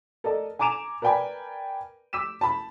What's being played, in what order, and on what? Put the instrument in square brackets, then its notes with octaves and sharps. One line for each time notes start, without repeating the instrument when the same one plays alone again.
[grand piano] A4 A#4 D5 D#5 A5
G#5 A#5 D6 D7 E7 F7
A#4 B4 D5 G5 G#5 B5
D6 E6 B6 E7
A5 B5